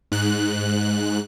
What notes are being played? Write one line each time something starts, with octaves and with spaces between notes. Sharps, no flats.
G#2 F#6